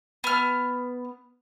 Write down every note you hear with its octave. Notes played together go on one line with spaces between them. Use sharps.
B3 F6